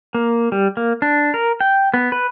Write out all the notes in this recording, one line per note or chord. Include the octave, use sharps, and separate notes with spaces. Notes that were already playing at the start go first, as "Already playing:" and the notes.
A#3
G3
A#3
D4
A#4
G5
B3
B4